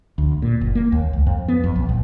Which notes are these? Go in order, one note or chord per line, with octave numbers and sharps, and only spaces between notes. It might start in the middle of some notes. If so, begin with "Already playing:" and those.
D2
A#2
F#1
A#3
D#2
C#2
F2
B3
F2
B1
A#1